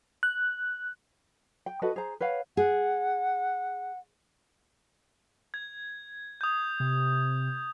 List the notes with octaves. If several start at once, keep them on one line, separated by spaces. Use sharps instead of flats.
F#6
G5
F#4 A4 B4 D#5
G#4 C5 A#5
B4 C#5 F5 F#5
G#4 F#5
G#6
D#6 G6
C3